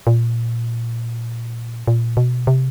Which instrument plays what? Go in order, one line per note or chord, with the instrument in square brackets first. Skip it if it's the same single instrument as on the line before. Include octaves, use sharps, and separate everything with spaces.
[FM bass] A#2
A#2
B2
C3